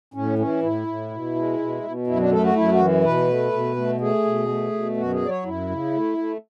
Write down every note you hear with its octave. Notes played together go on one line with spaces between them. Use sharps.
A2 C#4
E3 C#4
A2 E4
A2
B2
G#3
B2
B2
F#2 E4
D4
A3 A4
F#4
F#2 E4
F#4
E3
B2 B4
A3
B2
A3
A3 G#4
B2
A3
B2
F#2 F#4
G#4
F#3 D5
C#5
F#2 E4
C#3
A3
A3